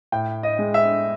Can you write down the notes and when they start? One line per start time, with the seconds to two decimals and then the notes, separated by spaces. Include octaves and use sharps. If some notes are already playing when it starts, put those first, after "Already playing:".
0.12 A2 G5
0.43 D#5
0.59 G#3
0.74 E5